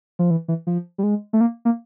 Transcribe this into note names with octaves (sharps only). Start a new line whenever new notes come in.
F3
E3
E3
F3
G3
G#3
A3
A#3
A#3